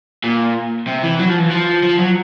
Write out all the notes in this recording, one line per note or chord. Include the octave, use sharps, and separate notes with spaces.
A#2
C3
E3
F#3
F3
E3
F3
F3
F#3